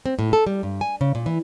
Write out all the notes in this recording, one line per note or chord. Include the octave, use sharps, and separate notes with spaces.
C4
A2
A4
G3
G2
G#5
C#3
A#2
E3